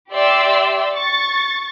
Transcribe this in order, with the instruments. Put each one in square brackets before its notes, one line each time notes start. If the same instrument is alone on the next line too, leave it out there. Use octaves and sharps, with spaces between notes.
[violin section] G4 D5 E5 C6 E6
C#6 A6